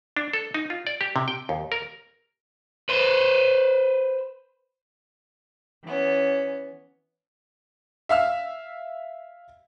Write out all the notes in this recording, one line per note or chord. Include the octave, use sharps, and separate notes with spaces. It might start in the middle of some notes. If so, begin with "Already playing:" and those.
D4
A4
D#4
F4
D5
G4
C3
G5
D#2
A#4
B4 C5
E3 B3 C#4
E5 F5 E6 F6